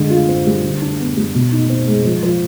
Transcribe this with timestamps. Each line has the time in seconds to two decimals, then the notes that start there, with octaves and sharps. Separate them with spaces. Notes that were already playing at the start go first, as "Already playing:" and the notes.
Already playing: D3 G#3
0.10 F4
0.28 C4
0.47 G3
0.64 D3
0.81 D4
1.00 B3
1.17 G3
1.35 B2
1.51 D#4
1.70 C4
1.87 G#3
2.05 F3
2.23 F3